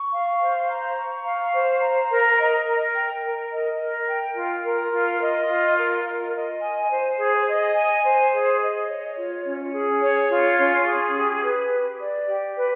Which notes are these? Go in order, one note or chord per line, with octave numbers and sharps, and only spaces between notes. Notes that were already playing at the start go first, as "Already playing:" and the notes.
Already playing: C#6
F5
C5
A#5
C#6
F5
C5
A#5
A#4
D#5
A#4
G5
A#4
D#5
A#4
G5
F4
A#4
F4
D#5
F4
A#4
F4
D#5
G#5
C5
G#4
D#5
G#5
C5
G#4
D#5
C#5
F4
C#4
G#4
C#5
F4
C#4
G#4
G4
B4
G4
D5
G4
B4